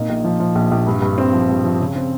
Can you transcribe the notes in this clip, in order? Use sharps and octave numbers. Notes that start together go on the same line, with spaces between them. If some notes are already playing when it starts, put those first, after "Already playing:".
Already playing: A#2 D#4
A#1
F3
F3
A#1
A#1
G2
G2
C4
F3
G2
F3
C#3
C4